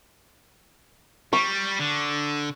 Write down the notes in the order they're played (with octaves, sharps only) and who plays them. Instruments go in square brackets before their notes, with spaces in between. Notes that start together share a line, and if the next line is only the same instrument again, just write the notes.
[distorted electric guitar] G3 [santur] C#6
[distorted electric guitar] D3